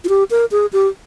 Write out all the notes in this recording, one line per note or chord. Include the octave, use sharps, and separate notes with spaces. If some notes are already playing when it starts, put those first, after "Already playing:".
F4
G4
A#4
G#4
G4